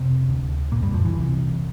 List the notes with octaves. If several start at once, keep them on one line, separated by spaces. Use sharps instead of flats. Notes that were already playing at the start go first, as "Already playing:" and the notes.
Already playing: F2 C3 C4
D2 D3
A#2 A#3
G2 G3
F2 F3
E3
C2 C3